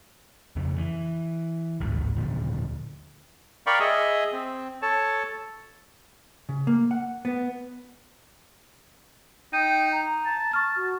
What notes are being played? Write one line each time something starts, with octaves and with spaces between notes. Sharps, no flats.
F2 C#3
E3
A1 D2 G#2
D#2 A#2 D3 F3
A#4 D5 F5 G5 B5 C#6
G#4 D#5 E5
C4
A4 C#5 A5
C#3
A#3
F#5
B3
D#4 G5 G6 D#7
A#5
A5
C#6 F6 A6
F#4